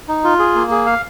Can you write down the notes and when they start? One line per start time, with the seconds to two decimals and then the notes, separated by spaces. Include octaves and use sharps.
0.08 D#4
0.24 F4
0.39 G#4
0.55 A#3
0.71 G#4
0.86 F5